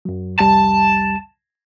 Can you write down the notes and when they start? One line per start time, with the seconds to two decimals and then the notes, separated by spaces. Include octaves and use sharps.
0.05 F#2 F#3
0.39 C2 F2 G3 A5